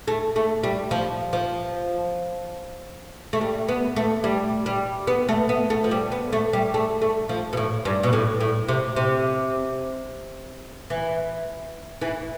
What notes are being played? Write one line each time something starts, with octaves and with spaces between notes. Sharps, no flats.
A3
A3
G3
F3
F3
A3
G3
B3
A3
G3
G3
B3
A3
B3
A3
F3
G3
B3
A3
G3
A3
A3
F3
B2
A2
G2
B2
A2
A2
C3
C3
E3
E3